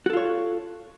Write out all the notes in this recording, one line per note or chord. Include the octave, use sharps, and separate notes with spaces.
F4 F#4 A4 C#5